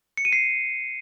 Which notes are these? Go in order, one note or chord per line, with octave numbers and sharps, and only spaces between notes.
C#7
D#7
C7